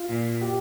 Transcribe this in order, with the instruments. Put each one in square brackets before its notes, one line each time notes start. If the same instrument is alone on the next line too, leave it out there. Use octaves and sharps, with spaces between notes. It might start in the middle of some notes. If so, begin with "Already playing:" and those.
Already playing: [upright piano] F4
[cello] A#2
[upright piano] G4